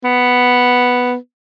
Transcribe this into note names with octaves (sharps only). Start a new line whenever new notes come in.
B3